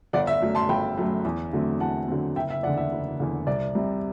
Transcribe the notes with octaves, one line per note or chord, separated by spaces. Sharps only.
G1 D5 F#5
E5
F#2 F#3 A3
A5 C6
G1 G5 B5
F#2 F#3 A3
E2
D3 F#3 A3 C4
E2 F#5 A5
D3 F#3 A3 C4
F#1 E5 G5
E5
E2 D3 D5 F#5
E5
F#1
E2 D3
C2 D5
C3 G3